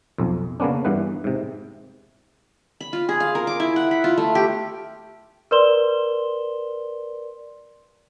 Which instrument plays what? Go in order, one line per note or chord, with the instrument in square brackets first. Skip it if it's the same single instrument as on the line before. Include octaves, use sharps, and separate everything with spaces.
[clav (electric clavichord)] B1 F2
C#3 A#3 B3 C#4 D4
G2 E3 B3 B4
G#2 C3
[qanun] B5
F4
G#4
F5
A#4
D6
E4
F#5
B5
F4
A3
G4
[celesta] A#4 B4 D5 C6 E7 G7